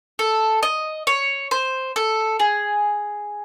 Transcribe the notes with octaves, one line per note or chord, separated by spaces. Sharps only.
A4
D#5
C#5
C5
A4
G#4